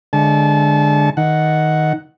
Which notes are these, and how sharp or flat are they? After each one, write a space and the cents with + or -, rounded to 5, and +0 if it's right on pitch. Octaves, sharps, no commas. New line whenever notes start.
D3 +0 G#3 +0 A5 -30
D#3 +5 F#5 +0